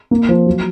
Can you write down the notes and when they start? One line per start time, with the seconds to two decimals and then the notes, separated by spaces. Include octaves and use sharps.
0.11 A#3
0.29 F3
0.46 F#3